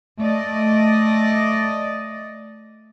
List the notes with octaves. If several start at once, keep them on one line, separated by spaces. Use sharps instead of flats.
A3 D5 D#5